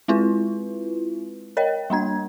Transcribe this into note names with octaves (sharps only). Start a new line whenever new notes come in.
G#3 C4 E4 F4 B4
A#4 C#5 D#5 G5
G3 A#3 D4 G#6